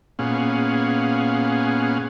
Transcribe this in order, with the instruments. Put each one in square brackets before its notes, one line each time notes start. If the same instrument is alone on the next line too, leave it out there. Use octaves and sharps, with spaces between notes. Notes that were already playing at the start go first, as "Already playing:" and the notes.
[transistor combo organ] A#2 B3 C#4 G#4 F5 F#5